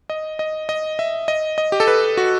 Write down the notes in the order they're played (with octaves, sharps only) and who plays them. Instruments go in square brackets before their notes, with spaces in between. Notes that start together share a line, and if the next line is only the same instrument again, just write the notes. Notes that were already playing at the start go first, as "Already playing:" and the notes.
[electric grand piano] D#5
D#5
D#5
E5
D#5
D#5
G4
A4
B4
F#4